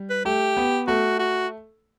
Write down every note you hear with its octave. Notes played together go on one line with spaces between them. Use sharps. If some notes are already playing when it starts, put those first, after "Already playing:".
Already playing: G3
B4
A3 G4
B3
A3 F#4
F#4